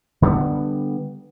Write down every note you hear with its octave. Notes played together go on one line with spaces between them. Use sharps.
D3 G3 A#3 B3